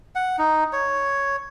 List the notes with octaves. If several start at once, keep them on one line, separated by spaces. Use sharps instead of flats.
F#5
D#4
C#5